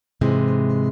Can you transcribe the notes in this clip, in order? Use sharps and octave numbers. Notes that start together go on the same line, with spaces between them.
G#2 C3 E3 G#3